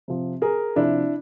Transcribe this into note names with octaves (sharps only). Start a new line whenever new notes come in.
C3 F3
G#4 A#4
C3 F3 D4 E4